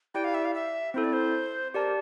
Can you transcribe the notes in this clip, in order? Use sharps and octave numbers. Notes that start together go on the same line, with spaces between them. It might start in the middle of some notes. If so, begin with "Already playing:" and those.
E4 G4 D5 G5
F5
E5
F5
E5
C4 E4 A4 C5
D5
C5
G4 A#4 D5 A5